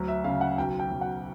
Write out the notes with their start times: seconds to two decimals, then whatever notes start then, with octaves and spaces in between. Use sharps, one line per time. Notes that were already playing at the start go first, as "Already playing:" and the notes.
Already playing: D2 F#3
0.08 E5
0.24 C#3 F5
0.41 F#5
0.58 B1 G5
0.80 G5
0.91 B1
1.01 F#5